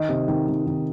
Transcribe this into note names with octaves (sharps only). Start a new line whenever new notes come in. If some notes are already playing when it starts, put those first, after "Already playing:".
Already playing: D#3 D#5
C3
D#3
D#3
D#3